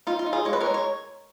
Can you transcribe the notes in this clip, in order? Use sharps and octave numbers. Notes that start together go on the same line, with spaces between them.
D#4 F4
F4
D#4
F4 G#4
G#3 C#5
B4
A#4 C#5
G#3
C#5